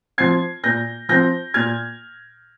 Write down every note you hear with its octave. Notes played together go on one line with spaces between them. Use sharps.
F3 C4 G#6 C7
A#2 G6 A#6
F3 C4 G6 A#6
A#2 F6 G#6